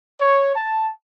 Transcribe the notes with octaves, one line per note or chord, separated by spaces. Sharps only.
C#5
A5